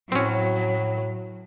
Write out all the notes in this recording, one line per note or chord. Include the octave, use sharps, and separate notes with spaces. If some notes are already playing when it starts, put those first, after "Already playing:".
A2 F#3 C4 C#4